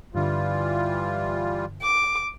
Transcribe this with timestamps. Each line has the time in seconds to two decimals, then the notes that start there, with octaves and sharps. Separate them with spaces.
0.15 G2 D3 E3 G3 F4
1.82 D6